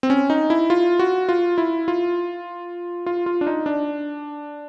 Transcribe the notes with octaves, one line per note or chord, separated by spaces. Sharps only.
C4
C#4
D#4
E4
F4
F#4
F4
E4
F4
F4
F4
D4
D#4
D4